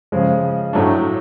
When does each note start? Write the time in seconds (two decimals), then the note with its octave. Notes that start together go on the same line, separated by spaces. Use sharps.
0.12 C#3 F3 G#3
0.73 A2 F#3 A3 D4